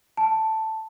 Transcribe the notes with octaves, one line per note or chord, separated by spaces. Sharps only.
A5